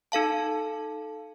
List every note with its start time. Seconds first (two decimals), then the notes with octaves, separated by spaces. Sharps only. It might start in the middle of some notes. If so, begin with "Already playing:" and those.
0.12 D#4 A4 F5 A5